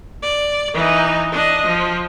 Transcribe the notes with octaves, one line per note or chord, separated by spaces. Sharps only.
D5
E3 D#4
D4 D#5
F3